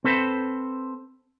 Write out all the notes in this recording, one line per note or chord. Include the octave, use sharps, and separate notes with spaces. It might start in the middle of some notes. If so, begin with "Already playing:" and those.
C4 A4 B4 C5